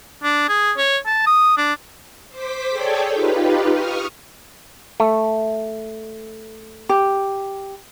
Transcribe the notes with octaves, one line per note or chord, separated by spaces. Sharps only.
D4
G#4
C#5
A5
D#6
D4
C5 D6 B6
G#4 A4 C#5 D5 G5 G#5
D#4 F4 G4 B4
C#6 D#6 F6
A3
G4